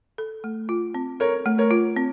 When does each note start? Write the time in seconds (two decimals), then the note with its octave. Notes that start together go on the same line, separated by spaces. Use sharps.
0.18 A4
0.44 A3
0.69 F4
0.94 C4
1.20 A4 A#4 C#5
1.46 A3
1.58 A#4 C#5
1.71 F4
1.96 C4